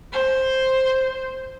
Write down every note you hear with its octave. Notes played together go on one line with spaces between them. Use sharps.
C5